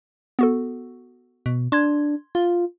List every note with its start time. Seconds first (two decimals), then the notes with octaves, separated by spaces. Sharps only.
0.39 B3 F#4 A4
1.46 B2
1.72 D4 C6 G#6
2.35 F4